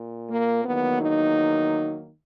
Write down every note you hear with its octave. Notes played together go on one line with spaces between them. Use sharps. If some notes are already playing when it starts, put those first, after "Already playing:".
Already playing: A#2
A#3
E2 D#3 F#3 A#3 B3
D#4